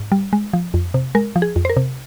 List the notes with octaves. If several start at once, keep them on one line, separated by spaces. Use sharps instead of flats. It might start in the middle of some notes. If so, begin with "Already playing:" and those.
Already playing: G#2
G3
G#3
F3
F2
C3
G#3 A#4
F3
G#4
F2
C5
A#4
C3